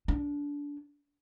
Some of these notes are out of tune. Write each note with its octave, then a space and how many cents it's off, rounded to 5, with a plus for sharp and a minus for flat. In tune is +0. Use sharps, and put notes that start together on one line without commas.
D4 -25